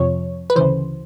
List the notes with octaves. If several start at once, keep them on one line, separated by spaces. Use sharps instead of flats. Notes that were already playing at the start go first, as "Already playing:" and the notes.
Already playing: F2 C3 F3 C#5
B4
D2 C#3 E3 C5